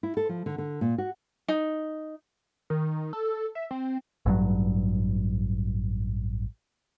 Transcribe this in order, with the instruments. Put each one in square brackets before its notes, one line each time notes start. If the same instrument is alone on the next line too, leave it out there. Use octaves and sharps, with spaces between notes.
[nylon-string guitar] E4
A4
F3
D3
D3
A#2
F#4
[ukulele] D#4
[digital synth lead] D#3
A4
E5
C4
[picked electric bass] A1 G2 F#3